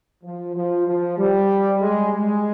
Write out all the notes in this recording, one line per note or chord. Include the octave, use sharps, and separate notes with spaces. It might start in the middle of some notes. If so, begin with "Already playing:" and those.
F3
F3
F3
G3
G#3
G#3